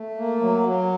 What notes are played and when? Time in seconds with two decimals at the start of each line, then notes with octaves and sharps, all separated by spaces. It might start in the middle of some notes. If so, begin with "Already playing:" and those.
Already playing: A3
0.18 A#3
0.41 F#3
0.66 F#3